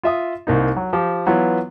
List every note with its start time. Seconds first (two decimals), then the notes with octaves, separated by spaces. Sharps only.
0.03 F4 E5 D#6
0.47 C2 A#3 D#4
0.76 F#3
0.93 F3 G4
1.26 E3 F#3 B3 F4